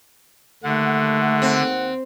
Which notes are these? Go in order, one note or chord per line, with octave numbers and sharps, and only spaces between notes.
D#2 D3 A3 F#5
C4